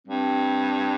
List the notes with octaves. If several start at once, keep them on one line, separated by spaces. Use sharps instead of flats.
G2 C4